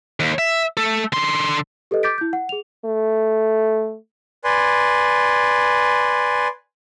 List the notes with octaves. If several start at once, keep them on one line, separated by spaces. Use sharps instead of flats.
D#2
E5
A3 A4
D3 C6
G4 A4 B4 D#5
D6 G6 A6 B6 D7
E4 G6
F#5
G#4 F7
A3
B4 D5 G#5 C6